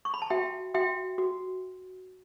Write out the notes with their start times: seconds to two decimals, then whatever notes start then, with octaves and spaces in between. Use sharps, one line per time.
0.05 C#6
0.14 B5
0.22 A5
0.30 F#4 E5 G5
0.75 F#4 E5 G5
1.18 F#4